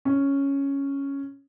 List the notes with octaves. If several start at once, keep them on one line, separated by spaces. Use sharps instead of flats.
C#4